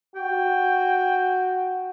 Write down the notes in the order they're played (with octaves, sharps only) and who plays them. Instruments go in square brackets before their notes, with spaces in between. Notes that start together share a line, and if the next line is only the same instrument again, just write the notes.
[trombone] F#4 [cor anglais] G5